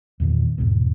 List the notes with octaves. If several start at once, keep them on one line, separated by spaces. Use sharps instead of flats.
E2 A#2 D#3
A#1 E2 G#2 B2